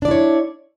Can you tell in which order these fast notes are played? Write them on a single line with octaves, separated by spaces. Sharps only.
D4 D5 E4 C#5